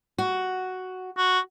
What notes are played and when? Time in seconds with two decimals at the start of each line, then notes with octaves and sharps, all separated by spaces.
0.18 F#4
1.18 F#4